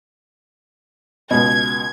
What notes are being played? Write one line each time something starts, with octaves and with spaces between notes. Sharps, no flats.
C#2 B2 G#6